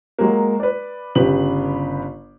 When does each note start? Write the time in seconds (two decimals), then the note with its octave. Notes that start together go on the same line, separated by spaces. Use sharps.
0.19 F#3 G#3 A#3
0.60 B4 D5
1.15 G1 C#3 G4 B4 F#7